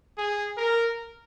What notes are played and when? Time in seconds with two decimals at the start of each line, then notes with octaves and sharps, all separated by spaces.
0.18 G#4
0.57 A#4